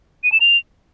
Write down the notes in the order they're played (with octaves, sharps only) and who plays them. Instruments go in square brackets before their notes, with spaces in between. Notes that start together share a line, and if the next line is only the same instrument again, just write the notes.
[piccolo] D#7
E7
F7